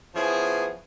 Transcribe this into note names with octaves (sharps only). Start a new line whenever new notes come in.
F3 B3 C#4 E4 G#4